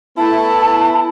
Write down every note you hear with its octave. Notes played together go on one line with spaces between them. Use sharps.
A3 B3 E4 A5